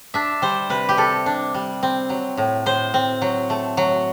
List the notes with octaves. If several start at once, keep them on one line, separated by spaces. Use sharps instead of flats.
D4 E5
G3 C5
C3 B4
G4
C3 A4
D4
G3
C4
F#3
A2
A2 C5
C4
F#3
A3
F#3